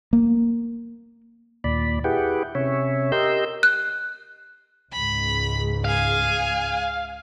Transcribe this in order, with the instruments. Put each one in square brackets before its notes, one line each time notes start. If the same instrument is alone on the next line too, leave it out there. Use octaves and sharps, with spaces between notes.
[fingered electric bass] A#3
[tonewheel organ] D#2 A#2 D5 B5
E4 G4 G#4 B4 F#5 G5
C3 C#4 C#5 E5
G4 A#4 D#5 C6 E6 G6
[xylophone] F#6
[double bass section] C#2 G#2 [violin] B5
[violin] G#4 G#5 [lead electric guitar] F5